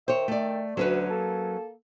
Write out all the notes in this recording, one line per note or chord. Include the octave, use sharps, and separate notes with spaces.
D#3 C5 C#5 E5 G5
A3 D5
D2 F#3 C#4 B4
A#3 A4